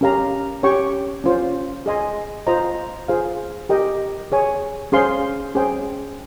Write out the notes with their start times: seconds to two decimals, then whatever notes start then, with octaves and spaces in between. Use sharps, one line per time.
0.01 C#4 G4 A#4 F5 A#5
0.63 C#4 G4 C#5 G5 C#6
1.24 C#4 F4 C5
1.86 G#4 D#5 G#5 C6
2.47 F4 C5 D#5 A#5
3.08 F4 G#4 C5 F5
3.69 G4 A#4 D#5 G5
4.32 G#4 C#5 G#5
4.92 C#4 G#4 C5 F5 C6
5.55 C#4 G#4 C5 G5